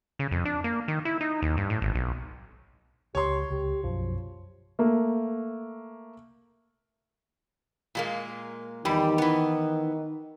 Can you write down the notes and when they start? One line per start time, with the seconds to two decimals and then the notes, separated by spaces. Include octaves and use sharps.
0.19 C#3
0.31 F2
0.45 D4
0.64 A#3
0.88 D#3
1.05 E4
1.21 D#4
1.42 D#2
1.57 G2
1.70 A2
1.82 G#1
1.95 B1
3.15 C#2 G4 C#5 C6
3.50 C#2 G4
3.83 B1 F#2 F3 F#3
4.79 A3 A#3
7.95 A#2 G#3 A#3
8.85 E2 D#3 G3 G4
9.18 E3 B3